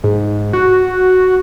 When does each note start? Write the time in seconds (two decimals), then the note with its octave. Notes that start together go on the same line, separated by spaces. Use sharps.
0.04 G#2
0.53 F#4